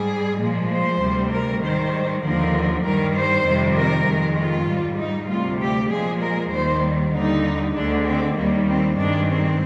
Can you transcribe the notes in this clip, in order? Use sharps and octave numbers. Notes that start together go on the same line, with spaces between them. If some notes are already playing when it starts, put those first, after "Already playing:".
Already playing: G#2 G3 G#4
A#2 F3 G#3
C5
D2 C3 G3
A#4
G#2 D#3 G3 C5
D#2 D3 F3 A#4
G2 D#3 G3 A#4
C5
F2 C3 D#3 G3
A#4
F2 D#3 G#3
F4
G#2 G3
D#4
D2 C3 G3 F4
G4
A#2 F3 G#3 G#4
A#4
D#2 D#3 G3 C5
D#2 D3 G3 D#4
D2 D3 G#3 D4
C4
D#2 D#3 G3 A#3
C4
G2 D#3 G#3 D4
C4